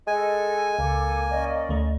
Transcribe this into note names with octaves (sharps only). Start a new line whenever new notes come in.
G#3 A4 D#5 G#5
C#2 A#3 A4 D6
C#4 D5 D#5
D2 A3